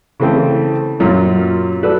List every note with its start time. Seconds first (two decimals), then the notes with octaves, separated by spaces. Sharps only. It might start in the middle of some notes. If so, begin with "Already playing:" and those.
0.20 C#3 E3 A3 C4
1.00 F#2 A#2 C#4 F4
1.83 F#3 A4 B4 D5